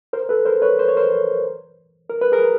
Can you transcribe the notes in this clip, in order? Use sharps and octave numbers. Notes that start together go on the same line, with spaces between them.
A#4 C5
A4 B4
A#4 C5
B4 C#5
C5
C#5
A#4 C5
A#4
B4
G#4 A#4